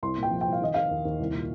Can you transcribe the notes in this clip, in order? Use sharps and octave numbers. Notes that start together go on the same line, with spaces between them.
C2 C6
A#2 G5
F3
G5
C2
F5
D#3 D#5
D#3 F5
D#2
D#2
C2
A#2